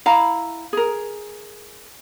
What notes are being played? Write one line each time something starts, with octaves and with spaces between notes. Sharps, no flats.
E4 F5 A#5 B5
G#4 A#4